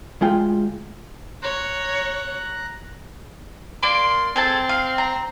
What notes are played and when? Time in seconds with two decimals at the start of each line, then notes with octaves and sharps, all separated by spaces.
0.21 D2 G#3 F4 G5
1.43 C#5 A#5 F#6
3.83 A#3 D5 C6 D6
4.36 C4 G#4 A4 A5
4.69 F5
4.98 A#5